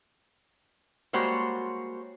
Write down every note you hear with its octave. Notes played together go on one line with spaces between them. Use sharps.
G3 G#3 A#3 F#4 C5 C#5